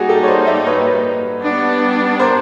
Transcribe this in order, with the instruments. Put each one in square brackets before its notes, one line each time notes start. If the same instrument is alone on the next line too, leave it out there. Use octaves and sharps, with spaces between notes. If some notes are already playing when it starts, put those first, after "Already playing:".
Already playing: [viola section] G3 A#3 D#4 [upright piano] F#4 G#4
[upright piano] G4 A4
C#5
C5 D5
D5 E5
B4 C#5
[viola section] G3 B3 D4
[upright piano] A#4 C5